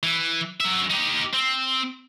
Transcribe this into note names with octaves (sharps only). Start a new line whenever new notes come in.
E3
F#3 E5
D#4 G4
C4